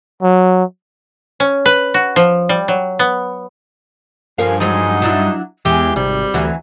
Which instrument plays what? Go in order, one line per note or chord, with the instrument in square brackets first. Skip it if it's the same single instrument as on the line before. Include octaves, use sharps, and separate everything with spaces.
[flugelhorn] F#3
[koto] C#4
B4
F#4
F3
G3
F#3
B3
[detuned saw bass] G2 [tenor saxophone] F3 [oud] C#4 A#4 F5
[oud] F3 F#3 G#3 [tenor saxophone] D#4
[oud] F#3 D4 E4
[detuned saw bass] E2 [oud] E3 G#3 [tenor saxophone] G4
[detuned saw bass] G#1 [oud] C3 [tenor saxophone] G3
[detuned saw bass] D2 [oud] E3 F#3 F#4